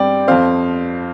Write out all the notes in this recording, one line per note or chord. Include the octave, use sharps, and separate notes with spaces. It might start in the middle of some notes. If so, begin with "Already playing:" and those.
Already playing: G2 G3 C4 D5 G5
F2 F3 C4 C5 F5